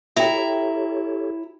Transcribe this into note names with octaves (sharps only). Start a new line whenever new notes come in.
E4 G4 A4 C#5 E5 G5 A#5